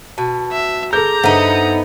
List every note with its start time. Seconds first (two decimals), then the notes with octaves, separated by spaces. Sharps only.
0.18 B2 A5
0.52 E5
0.93 G#4 A4 B4 A#5 D6 G6
1.24 G2 B3 D#4 A4 C5 E5